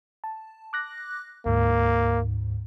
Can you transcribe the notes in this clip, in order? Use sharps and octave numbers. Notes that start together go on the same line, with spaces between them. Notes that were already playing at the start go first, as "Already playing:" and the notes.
A5
D6 F#6 A#6
D2 G#2 A#3